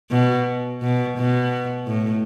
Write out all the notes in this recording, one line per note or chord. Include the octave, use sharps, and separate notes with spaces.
B2
B2
B2
A2